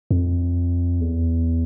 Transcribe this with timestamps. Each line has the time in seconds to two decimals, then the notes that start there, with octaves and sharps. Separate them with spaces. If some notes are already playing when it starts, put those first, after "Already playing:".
0.11 F2
1.01 E2